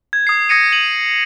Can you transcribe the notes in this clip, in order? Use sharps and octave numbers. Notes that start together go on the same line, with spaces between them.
G#6
D#6 C7
D#6 G#6 A#6 C#7 D#7
D#7 F#7